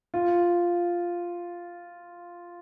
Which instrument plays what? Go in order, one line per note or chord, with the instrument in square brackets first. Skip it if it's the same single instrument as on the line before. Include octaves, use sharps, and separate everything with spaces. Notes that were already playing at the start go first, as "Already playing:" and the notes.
[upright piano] F4